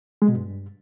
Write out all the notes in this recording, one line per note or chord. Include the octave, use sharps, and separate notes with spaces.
G#3
B2
G2